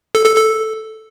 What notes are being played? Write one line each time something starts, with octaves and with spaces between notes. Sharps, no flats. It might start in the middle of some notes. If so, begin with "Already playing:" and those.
A4
A4
A4